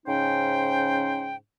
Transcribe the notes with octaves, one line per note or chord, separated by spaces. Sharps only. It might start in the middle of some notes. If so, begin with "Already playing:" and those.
G#2 C#3 C#4 D#4 C5 G5